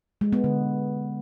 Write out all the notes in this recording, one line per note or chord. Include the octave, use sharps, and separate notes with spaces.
G#3
B3
D3